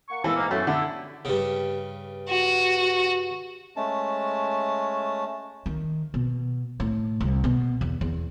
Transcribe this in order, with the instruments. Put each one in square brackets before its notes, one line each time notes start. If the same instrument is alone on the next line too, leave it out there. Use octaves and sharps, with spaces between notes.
[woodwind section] A#3 F#5 C#6
[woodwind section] D#3 F4 A4 [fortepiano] E3
[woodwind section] G#2 A#3
[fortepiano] F#2 [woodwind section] A3
[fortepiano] D3 [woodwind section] E4
[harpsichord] G2 C#3
[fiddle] F#4
[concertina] G#3 A3 C#4 A5
[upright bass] D#3
B2
A2
C2
B2
E2
E2